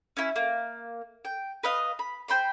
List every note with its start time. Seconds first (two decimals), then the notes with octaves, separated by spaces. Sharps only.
0.17 C#4 E4
0.36 A#3
1.25 G5
1.63 B4 D#5 F5
1.99 B5
2.28 C5 G5 B5 C6